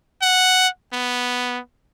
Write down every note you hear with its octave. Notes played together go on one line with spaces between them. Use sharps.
F#5
B3